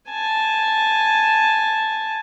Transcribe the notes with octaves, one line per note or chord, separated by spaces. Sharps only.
G#5 A5